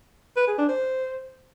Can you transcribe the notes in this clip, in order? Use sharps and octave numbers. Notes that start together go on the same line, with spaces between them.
B4
G#4
D4
C5